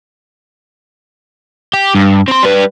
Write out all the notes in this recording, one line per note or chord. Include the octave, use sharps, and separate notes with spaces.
G4
G2
C4 C6
G3 B4